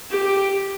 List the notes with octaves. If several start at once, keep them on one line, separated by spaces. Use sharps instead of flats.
G4